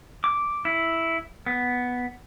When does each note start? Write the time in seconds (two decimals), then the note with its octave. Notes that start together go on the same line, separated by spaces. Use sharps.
0.24 D6
0.65 E4
1.46 B3